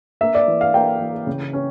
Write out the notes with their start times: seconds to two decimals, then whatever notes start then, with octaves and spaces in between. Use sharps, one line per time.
0.21 A#3 E5
0.35 D5
0.48 E3
0.61 F5
0.74 A#3 G5
1.00 E3
1.27 C#3
1.53 C#4